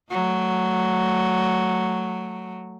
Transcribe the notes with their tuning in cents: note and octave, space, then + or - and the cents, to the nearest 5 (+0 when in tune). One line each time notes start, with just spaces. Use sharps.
F#3 +0 A3 +0